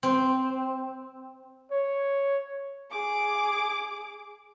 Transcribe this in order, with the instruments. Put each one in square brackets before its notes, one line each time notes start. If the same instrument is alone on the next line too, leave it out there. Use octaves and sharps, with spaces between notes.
[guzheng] C4
[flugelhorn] C#5
[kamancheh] G#4 D6